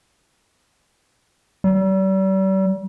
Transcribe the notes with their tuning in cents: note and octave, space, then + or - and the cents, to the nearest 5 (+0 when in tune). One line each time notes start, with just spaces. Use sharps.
G3 -40